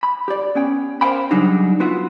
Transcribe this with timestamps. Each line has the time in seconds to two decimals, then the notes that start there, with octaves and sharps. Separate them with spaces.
0.03 B5
0.28 G4 D5
0.55 B3 C#4 G5
1.01 A#4 C5 C#5 F5 G5 B5
1.31 C#3 F#3 G3 D4 D#4
1.80 B3 F4 F#4 E5 F#5